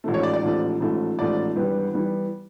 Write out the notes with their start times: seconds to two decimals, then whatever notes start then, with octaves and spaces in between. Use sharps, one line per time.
0.04 A1 G#2 F3 A3
0.14 C#5
0.23 D5
0.33 D5
0.43 A1 G#2 F3 A3
0.80 A1 G#2 F3 A3
1.19 A1 G#2 F3 A3 D5
1.56 G#1 G2 E3 G3 B3
1.93 E3 G3 B3